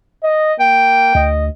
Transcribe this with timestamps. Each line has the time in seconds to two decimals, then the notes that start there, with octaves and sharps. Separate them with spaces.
0.23 D#5
0.60 A#3 G5
1.15 D2 D#5